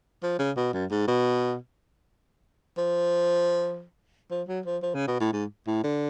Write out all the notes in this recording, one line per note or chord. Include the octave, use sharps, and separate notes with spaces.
F3
C#3
B2
F#2
G#2
B2
F3
F3
F#3
F3
F3
C#3
B2
A2
G#2
A2
D3